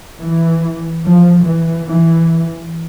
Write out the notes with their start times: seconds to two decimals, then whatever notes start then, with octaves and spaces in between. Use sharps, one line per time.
0.22 E3
1.03 F3
1.44 E3
1.85 E3